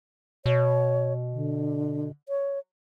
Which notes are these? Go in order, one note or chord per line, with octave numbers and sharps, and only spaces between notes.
B2 C#5
D3
C#5